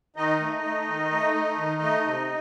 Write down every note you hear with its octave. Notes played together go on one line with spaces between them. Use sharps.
D#3 D#4 D#5
A3
A3
D#3
A3
A3
D#3
A3
C3